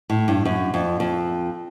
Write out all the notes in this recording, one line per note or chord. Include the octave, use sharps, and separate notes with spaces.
A2
G2
F#2
F2
F2